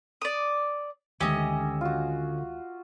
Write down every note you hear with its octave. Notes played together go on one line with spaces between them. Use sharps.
D5 D#6
D2 D3 D#3 G#3 C#4 G4 D#5 E5
F4 F#4